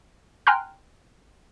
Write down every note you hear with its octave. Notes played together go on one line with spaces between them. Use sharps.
G5 G#5 A#5 C6 F6 F#6